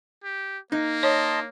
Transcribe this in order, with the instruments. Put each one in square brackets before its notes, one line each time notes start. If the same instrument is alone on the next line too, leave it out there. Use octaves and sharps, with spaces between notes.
[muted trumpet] G4
[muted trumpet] A#3 [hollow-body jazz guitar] D#4
[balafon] C#5 [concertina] D#5 A5 C6